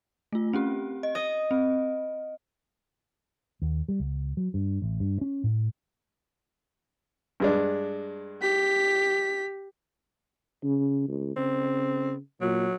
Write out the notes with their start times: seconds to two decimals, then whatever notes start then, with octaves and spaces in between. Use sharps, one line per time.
0.33 A3 F4
0.53 C4 C#4 G4
1.03 D#5
1.15 D#5 D#6
1.51 C4
3.62 D#2
3.88 G3
4.00 C#2
4.37 F#3
4.54 G2
4.82 A1
5.00 G2
5.21 C#4
5.44 A2
7.40 G2 G#3 D4
8.41 G4 B6
10.64 C#3
11.08 C#2
11.37 C#3 C4
12.41 A#2 F#3